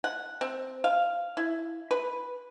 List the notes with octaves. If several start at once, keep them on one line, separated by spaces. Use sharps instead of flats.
F#5
C4
F5
E4
B4